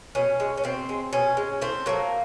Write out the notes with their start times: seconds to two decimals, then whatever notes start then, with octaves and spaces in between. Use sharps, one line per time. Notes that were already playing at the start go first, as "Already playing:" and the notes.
0.15 B2 C#4
0.40 G#3
0.58 C#4
0.64 B2 C4
0.89 G#3
1.13 B2 C#4
1.37 G#3
1.62 A2 C4
1.86 F#3 A3 A#3